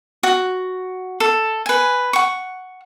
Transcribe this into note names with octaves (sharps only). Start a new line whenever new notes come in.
F#4
A4
B4 G#5
F#5 C#6